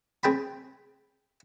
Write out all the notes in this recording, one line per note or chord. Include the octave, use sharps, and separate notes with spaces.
C4 G#4 G5 A5 B5